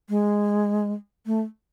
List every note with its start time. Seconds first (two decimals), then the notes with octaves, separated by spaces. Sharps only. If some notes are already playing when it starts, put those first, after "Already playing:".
0.09 G#3
1.26 A3